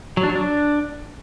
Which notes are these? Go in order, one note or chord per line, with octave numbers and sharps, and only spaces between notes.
F#3
D4
F#3
D4